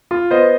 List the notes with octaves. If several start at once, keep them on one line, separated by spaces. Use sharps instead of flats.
F4
B3 C5 D#5